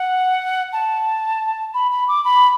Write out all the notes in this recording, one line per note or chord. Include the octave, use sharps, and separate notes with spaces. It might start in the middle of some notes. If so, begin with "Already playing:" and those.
Already playing: F#5
A5
B5
B5
D6
B5